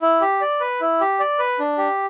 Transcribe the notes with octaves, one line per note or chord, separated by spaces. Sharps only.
E4
G4
D5
B4
E4
G4
D5
B4
D4
G4